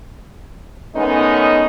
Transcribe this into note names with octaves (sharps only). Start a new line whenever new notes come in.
D#3 G#3 A3 B3 C#4 D#4